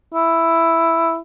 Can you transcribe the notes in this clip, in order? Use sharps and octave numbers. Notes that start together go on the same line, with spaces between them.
E4